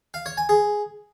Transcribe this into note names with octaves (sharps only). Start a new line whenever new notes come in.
F5
C#5
G#5
G#4